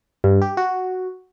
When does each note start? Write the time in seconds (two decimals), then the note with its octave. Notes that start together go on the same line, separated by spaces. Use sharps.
0.24 G2
0.42 G4
0.57 F#4